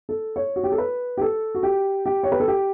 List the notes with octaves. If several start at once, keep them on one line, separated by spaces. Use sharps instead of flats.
A4
C#5
F#4
G4
A4
B4
G4
A4
F#4
G4
G4
C#5
B4
A4
G4